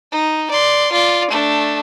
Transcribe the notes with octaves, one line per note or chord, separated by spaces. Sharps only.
D#4
D5 C6
F4 D5
A3 D4